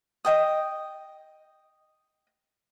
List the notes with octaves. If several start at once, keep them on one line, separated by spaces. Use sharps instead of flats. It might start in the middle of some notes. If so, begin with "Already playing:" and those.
D#5 G5 D#6